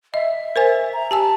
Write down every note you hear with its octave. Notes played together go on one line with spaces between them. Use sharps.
D#5 E5
A#4 C5 G#5
A#5
G4 G#5 A5 E6